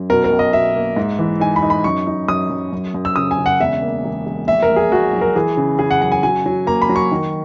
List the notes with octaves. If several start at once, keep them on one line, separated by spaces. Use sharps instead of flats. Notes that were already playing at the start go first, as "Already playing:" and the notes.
Already playing: F#2
B2 A#4
A#4
B1
D#5
B2 E5
A#3
G#2
E3
D#4 G#5
B5
D#4
B5
F#2 C#6
D#4
F#2 D#6
F#2
F#2
F#2
E6
C#3 D#6
G#5
C#3
F#5
E1 E5
A#3
E1
E1
A#1 E5
A#4
A#1
G#4
A#1 F#4
F#3
A#4
E3 G#4
C#3
C#3 G#4
F#5
F#2 F#5
G#5
F#3 G#5
F#3
A#3 A#5
B5
F#3
C#6
D#3